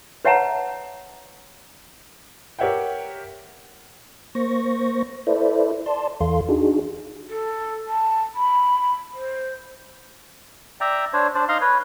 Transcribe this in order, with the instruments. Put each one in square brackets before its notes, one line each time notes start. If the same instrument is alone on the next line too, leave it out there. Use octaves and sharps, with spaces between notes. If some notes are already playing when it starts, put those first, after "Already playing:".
[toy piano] B4 C#5 E5 F#5 A5 A#5
[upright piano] G4 A#4 C#5 E5 F#5 G5
[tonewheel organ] A#3 C5 C#6 A#6
E4 A4 B4 C5 D5 E5
D5 A5 C6
E2 E3 A4 F5 C6
D4 D#4 F#4 G#4
[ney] A4
A5
B5
C5
[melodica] D5 E5 G5 A#5
D4 C5 C#5
D4 C5 D5
D#4 F5 A#5 C6
B4 C#5